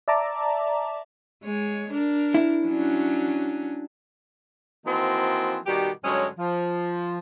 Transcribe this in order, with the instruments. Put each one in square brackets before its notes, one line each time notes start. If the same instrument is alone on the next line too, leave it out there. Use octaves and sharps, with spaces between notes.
[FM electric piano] D5 E5 A5 A#5 D6
[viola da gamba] G#3 C#5
D4 A#4
[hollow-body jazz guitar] E4
[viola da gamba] F#3 C#4 D4
[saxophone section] E3 F3 A#3 C4 D#4 F#4
B2 D#3 G3 F#4 G4
G2 D3 F#3 G#3 C#4 C#5
F3